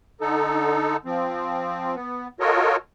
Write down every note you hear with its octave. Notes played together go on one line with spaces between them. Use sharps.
D3 D#4 A4
F3 C4
B3
F4 F#4 A4 A#4 C#5 D#5